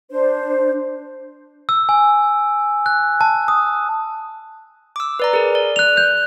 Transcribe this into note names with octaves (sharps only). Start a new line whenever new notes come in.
D4 C5
E6
G#5
F#6
A5
D#6
D6 E6
B4 D5 A#5
G#4 A#4
D5
F#6 F7
G6 F7